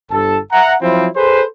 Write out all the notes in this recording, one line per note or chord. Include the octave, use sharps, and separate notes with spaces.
G1 A4 A5
E5 F#5 A#5
F3 F#3 C4 E4
G#4 A4 B4 C5